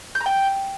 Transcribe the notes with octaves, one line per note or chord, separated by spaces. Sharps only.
G6
A#5
G5